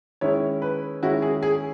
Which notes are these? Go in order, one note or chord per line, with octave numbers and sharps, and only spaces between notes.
D#3 G#3 C#4 E4 C#5
B4
D#3 G#3 C#4 E4 F#4
G#4
G#4